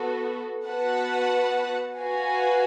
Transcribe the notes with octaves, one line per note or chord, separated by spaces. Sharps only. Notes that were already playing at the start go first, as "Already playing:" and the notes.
Already playing: B3 F#4 A4
B3 F#4 B4 F#5 A5
F#4 B4 F5 G#5